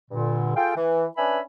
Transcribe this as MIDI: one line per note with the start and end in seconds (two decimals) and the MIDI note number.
0.11 0.55 43
0.11 0.55 46
0.11 0.55 50
0.56 0.76 65
0.56 0.76 68
0.56 0.76 69
0.56 0.76 77
0.56 0.76 79
0.76 1.07 52
1.17 1.40 61
1.17 1.40 62
1.17 1.40 71
1.17 1.40 76
1.17 1.40 80
1.17 1.40 83